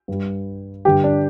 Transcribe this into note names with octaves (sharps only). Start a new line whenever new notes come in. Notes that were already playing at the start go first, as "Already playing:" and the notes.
G2 G3
G2 D3 G3 G4
D4